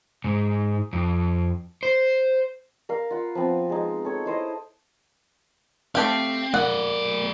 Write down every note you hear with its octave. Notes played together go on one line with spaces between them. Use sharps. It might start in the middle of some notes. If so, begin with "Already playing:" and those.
G#2
F2
C5
A#4 F5
F4 F#5 B5
F3 B3 C4
G#3 D#4
A4 C#5
E4 C5 D#5
A3 C4 G4 F5
F#3 A#3 D5 F#5